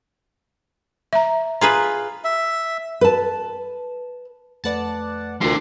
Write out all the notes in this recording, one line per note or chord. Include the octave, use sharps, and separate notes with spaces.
E5 A#5
F4 G#4 B4 A#5
E5
B4 A5
F2 A3 B4 D5 F#5 A5
D2 D4 F4 A#4 C6